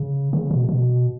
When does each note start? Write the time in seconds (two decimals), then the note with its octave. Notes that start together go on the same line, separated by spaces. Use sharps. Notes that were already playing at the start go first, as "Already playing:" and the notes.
Already playing: C#3
0.33 C#3
0.51 B2
0.69 B2